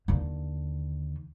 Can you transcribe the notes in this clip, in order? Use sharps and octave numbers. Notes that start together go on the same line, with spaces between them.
D#2 D3